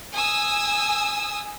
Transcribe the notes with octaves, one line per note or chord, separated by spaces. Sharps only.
G#5 D#6 E6